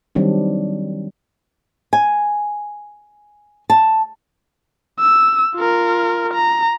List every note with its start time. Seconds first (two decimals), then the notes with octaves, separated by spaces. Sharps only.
0.15 D#3 F#3 G3 C4 D4
1.93 G#5
3.70 A5
5.00 E6
5.55 F4 A#4
6.34 A#5